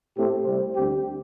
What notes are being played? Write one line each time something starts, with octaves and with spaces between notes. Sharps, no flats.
A2 A3 C4 G4
C2 C3 G3 C4
D2 D3 C4 G4